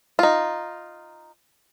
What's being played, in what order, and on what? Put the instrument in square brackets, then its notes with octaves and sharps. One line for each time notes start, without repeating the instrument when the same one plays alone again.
[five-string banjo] D#4 F4